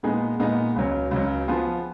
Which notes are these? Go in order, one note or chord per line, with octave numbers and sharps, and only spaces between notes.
A#2 G#3 B3 D#4 G#4
A#2 G#3 B3 D#4 G#4
C#2 C#3 F#3
C#2 C#3 F#3
F3 B3 F4 G#4